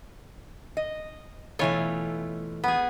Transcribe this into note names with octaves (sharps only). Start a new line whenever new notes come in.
D#5
B2 E3 A3 F4 C#5 F5
B3 G#4